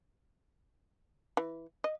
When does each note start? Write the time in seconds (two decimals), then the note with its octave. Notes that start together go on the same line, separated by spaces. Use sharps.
1.37 E3
1.84 D#5